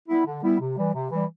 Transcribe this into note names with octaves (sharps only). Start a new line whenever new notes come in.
G3 B3 E4
D3
G3 B3 E4
C3
E3 G3
C3
E3 G3